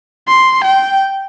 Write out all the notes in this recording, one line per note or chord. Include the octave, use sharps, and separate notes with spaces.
C6
G5